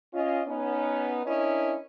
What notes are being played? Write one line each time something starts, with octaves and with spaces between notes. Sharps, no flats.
C#4 F4 D#5
B3 C#4 D#4
C#4 D4 E4 A#4 C#5 D#5